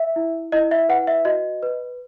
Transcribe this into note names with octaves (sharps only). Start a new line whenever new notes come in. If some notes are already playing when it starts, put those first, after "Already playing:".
Already playing: E5
E4
E4 D#5
E5
B4 F#5
E5
F#4 D#5
B4